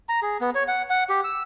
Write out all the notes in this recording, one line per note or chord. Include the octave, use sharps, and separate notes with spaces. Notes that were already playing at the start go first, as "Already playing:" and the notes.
A#5
G#4
B3
C#5
F#5
F#5
G4
E6